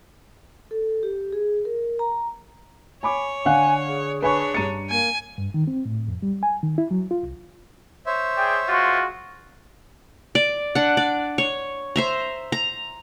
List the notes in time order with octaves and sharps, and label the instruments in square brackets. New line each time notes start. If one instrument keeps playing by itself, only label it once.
[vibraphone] A4
G4
G#4
A#4
A#5
[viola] C#5 [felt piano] G#5 B5 D6
[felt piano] D3 [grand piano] F5 F#5 F#6 [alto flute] G#5
[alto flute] G#4
[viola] D4 C#5 [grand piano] B4 G#5 C#6
[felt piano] G2 A#5 A6 [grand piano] C#7 D#7
[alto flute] A#3 [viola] G#5
[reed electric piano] G2
D#3
C4
A2
F2
G3
G#5
D#3
E4
F#3
F4
C2
[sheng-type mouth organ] C5 C#5 E5
[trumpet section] G#4 D5 G5
G#3 F4 F#4
[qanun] D5
D4 F#5
D5
C#5
C5 E5 A#5
A#5